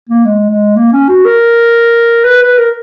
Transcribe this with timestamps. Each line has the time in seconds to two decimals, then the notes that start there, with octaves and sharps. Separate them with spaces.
0.09 A#3
0.25 G#3
0.50 G#3
0.76 A#3
0.93 C#4
1.09 F#4
1.25 A#4
2.24 B4
2.42 B4
2.58 A#4